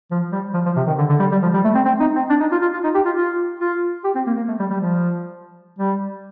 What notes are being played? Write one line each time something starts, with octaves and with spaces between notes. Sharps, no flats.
F3
G3
F3
F3
C3
D#3
D3
D3
G3
G3
F3
G3
A3
C4
C4
D#4
C4
D4
D#4
F4
F4
F4
D#4
G4
F4
F4
F4
G4
C4
A#3
A#3
A3
G3
G3
F3
G3